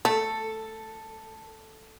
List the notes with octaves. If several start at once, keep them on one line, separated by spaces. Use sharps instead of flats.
A3 A4